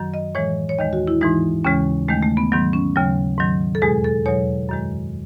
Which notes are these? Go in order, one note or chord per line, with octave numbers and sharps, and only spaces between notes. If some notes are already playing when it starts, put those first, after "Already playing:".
Already playing: F#2 D#3 F#3
D#5
A2 E3 G#3 C#5
C#5
D#2 D#3 G#3 D#5
F#4
E4
G#2 E3 G#3 D#4
D#2 C#3 E3 G#3 C#4
D#2 D#3 G#3 A3
A3
B3
G#2 D#3 F#3 B3
C#4
D#2 C#3 F#3
G#2 D#3 F#3
A4
E2 B2 G#3 G#4
A4
E2 B2 F#3 C#5
F#2 D#3 G#3